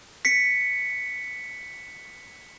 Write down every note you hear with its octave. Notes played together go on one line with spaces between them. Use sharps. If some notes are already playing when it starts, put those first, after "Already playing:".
B6 C#7